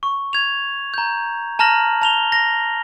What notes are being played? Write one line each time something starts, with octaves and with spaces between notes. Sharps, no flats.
C#6
G#6 F7
A#5 G6
A5 A#5 F6 A#6 F#7
A5 F7 G7
A#6